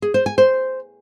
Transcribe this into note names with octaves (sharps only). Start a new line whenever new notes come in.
G#4
C5
G#5
C5